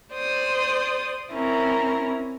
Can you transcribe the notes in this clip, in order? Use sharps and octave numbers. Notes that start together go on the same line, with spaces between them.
C5 D5 D#6
C4 C#4 E4 A#4 A#5